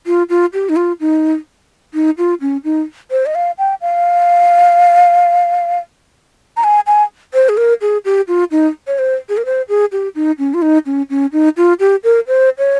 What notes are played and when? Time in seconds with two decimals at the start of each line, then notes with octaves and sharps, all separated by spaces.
0.07 F4
0.29 F4
0.54 G4
0.69 D#4
0.76 F4
1.00 D#4
1.94 D#4
2.18 F4
2.41 C#4
2.64 D#4
3.11 C5
3.26 D#5
3.35 F5
3.58 G5
3.81 F5
6.57 A#5
6.64 G#5
6.87 G#5
7.34 C5
7.49 G#4
7.57 A#4
7.81 G#4
8.05 G4
8.28 F4
8.51 D#4
8.87 C#5
8.99 C5
9.29 G#4
9.37 A#4
9.45 C5
9.69 G#4
9.92 G4
10.15 D#4
10.39 C#4
10.54 F4
10.62 D#4
10.86 C#4
11.10 C#4
11.33 D#4
11.57 F4
11.80 G4
12.04 A#4
12.28 C5
12.58 C#5